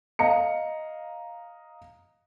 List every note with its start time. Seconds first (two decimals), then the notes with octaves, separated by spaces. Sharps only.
0.19 D#5 F5 A#5 C#7